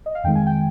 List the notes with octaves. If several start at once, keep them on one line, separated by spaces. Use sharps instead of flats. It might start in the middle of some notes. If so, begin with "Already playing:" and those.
D#5
F5
F2 D#3 G#3 G5
G#5
G5